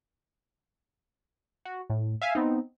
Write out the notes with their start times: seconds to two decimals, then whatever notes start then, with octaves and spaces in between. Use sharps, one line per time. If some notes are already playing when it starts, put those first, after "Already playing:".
1.65 F#4
1.90 A2
2.22 E5 F5 G#5
2.35 B3 C4 D#4